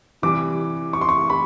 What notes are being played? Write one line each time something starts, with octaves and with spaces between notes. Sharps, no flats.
C3 E3 G3 D6
C#6
C6
C#6
B5